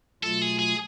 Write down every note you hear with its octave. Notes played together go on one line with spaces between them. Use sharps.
B2 F#3 A3 F4 A4
G#4
G#4